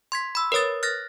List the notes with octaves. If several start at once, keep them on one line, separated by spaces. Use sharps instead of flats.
C6 G#6 B6
B5 E6
A#4 B4 C#5 D#6 A6
F6 F#6 A6 A#6